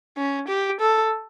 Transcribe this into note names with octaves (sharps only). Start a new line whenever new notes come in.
C#4
G4
A4